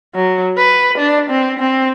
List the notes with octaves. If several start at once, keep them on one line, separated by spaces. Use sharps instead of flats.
F#3
B4
D4
C4
C4